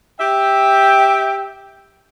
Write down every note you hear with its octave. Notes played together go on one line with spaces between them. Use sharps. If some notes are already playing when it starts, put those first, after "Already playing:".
G4 E5 G5